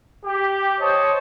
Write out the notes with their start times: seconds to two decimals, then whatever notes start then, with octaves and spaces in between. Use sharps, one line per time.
0.24 G4
0.79 C5 C#5 D#5 A5